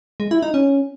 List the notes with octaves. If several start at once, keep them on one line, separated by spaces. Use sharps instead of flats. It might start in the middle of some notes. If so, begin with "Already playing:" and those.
G#3
E4
D#4
C#4